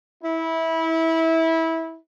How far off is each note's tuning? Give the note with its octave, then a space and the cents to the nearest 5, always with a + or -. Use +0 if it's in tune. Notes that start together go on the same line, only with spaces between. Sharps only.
E4 -20